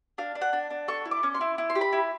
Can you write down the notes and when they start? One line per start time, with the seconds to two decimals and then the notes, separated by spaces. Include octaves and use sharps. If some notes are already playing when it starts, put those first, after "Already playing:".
0.18 D4 F5
0.35 D4
0.41 F#5
0.53 D4
0.70 D4
0.88 A4 C#6
1.05 E4
1.11 D6
1.23 C#4
1.35 C6
1.41 E4
1.58 E4
1.70 C6
1.75 G4
1.81 B5
1.93 E4